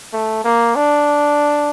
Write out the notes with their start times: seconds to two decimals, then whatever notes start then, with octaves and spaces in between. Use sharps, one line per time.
0.13 A3
0.44 A#3
0.75 D4